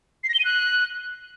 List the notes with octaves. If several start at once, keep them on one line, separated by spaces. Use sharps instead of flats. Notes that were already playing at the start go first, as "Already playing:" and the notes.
C7
A#6
G7
D#7
F#6